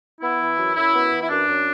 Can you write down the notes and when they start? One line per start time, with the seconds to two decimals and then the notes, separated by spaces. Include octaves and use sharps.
0.21 B3 E4
0.40 E3
0.58 F#2
0.75 F#2 E4
0.94 B3
1.12 E3
1.22 E4
1.29 F#2 D4
1.47 F#2